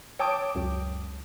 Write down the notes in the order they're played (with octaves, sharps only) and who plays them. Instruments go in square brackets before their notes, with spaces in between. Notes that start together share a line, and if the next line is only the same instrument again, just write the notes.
[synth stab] C#5 D6 D7 [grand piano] G5 A5 D#6
[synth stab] C#2 F#2